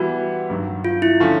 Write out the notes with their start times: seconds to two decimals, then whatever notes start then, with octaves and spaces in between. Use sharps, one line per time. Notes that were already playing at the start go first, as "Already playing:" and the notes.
Already playing: E3 G3 B3 E4 F#4
0.50 G2 D#3 F#3
0.85 F4
1.02 E4
1.20 D3 F3 A3 C#4 F4